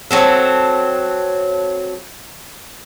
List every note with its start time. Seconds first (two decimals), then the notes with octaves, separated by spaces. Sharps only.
0.11 F#3 C4 A4